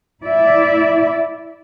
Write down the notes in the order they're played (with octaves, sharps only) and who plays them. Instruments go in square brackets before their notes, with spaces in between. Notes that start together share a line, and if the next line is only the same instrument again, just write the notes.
[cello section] E4 D5 E5